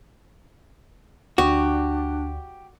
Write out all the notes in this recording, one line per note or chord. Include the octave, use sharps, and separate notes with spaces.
D2 D4 F#4 G4